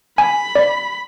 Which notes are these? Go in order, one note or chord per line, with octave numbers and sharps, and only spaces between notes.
G#5 B5
D5